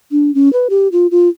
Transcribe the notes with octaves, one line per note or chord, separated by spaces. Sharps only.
D4
C#4
B4
G4
F4
F4